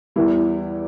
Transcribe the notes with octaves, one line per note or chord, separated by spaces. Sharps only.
E2 E3 G3 E4